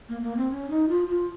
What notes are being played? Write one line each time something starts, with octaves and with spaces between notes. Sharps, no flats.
A#3
A#3
C4
C#4
D#4
F4
F4